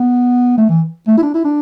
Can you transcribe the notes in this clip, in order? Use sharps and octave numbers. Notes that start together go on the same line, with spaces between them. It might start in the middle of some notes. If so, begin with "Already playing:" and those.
Already playing: B3
A3
E3
A3
E4
D4
E4
D4